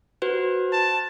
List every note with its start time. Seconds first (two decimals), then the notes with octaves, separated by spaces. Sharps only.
0.22 F#4 B4 C5
0.72 A5